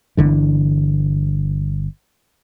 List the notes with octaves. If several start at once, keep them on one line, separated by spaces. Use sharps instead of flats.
G1 C2 D3 E3